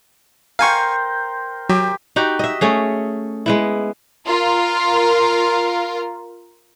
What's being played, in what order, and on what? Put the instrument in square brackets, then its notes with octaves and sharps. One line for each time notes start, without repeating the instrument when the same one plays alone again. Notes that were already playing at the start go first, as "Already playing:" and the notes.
[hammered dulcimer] A#4 C5 G5 [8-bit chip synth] F5 G#5 C#6
[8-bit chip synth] F#3 [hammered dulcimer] G4
[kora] D#4 F#4 G4
D#5 E5
A3 C#4 G#4
G#3 B3 E4
[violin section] F4 A#4